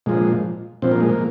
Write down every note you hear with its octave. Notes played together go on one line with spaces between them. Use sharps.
A#2 F3 G#3
A#2 F3 C4
A#3
G#3
A#3